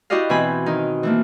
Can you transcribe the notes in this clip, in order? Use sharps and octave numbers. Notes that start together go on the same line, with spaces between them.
E4 F#4 G4 D5 D#5 F5
B2 E3 C4 G#5 B5
D#3 D#4
E3 A3 A#3